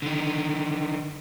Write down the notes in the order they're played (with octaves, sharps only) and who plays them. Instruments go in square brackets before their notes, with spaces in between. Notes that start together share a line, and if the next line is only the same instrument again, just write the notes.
[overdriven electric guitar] D3 D#3